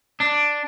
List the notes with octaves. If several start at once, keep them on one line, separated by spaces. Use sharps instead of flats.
D4